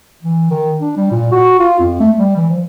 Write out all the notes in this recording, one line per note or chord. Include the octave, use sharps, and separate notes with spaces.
E3
D#3
D4
G3
A#2
F#4
F4
F2
A3
G3
E3
F3